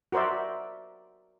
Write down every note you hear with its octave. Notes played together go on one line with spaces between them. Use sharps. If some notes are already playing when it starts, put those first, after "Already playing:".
F#4 A#4 C5 D5 E5